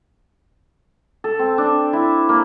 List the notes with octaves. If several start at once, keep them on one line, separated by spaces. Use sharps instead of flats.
A4
C4
D4
E4
A#3